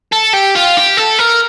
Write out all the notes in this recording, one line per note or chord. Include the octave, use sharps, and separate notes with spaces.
A4
G4
F4
G4
A4
A#4